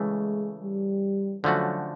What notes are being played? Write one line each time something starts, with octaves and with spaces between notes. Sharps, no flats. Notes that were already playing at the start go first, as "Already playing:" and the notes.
Already playing: C#3 E3 G#3 A3
G3
D3 F3 F#3 A3 C#4 F#4